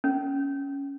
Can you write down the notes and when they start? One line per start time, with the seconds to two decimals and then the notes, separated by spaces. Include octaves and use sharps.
0.04 C#4